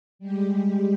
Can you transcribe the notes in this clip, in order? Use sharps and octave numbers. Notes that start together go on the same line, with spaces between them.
G3 G#3 G4